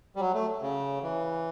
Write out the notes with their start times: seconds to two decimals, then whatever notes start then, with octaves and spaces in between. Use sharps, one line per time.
0.16 G3
0.20 F#3
0.34 A3
0.61 C#3
1.03 E3